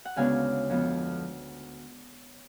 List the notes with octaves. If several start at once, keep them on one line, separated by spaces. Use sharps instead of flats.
F#5
D2 C#3 G#3 B3 D4 F5 G#5
F2 F3 B3